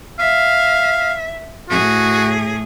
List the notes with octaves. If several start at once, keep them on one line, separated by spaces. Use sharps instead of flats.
E5 F5
A2 F#4 G#4